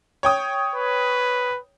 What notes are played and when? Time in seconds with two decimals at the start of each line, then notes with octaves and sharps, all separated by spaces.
0.23 C#5 G5 D#6
0.75 B4